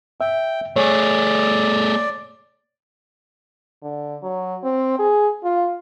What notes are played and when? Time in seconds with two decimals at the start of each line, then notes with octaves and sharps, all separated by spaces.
0.21 E5 G5
0.76 A3 G#4 C#5 D5
3.83 D3
4.23 F#3
4.63 C4
4.99 G#4
5.43 F4